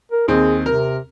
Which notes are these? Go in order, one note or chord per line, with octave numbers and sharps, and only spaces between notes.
A#4
D#2 C4 G#4
C3 A#4